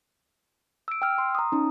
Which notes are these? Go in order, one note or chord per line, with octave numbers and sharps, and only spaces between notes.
E6 D7
G5 E6 F6
C6
A#5 D#6
C#4 D#4